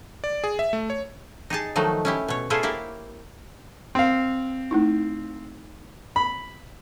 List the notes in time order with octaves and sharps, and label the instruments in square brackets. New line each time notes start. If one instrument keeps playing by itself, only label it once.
[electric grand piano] D5
G#4
E5
A3
C#5
[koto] D#4 G4 G#4 A5
D#3 F3 F#3 A3 D#4
C#4 E4 G4
B2 C#5
E4 F4 G#4 A4 C5 C#5
A#3 E4 G4
[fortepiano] C4 F5
[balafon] A3 D#4 E4
[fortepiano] B5